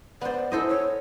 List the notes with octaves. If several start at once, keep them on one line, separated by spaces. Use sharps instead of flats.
B3 C5 D5
E4 A4 C5 D#5
C#5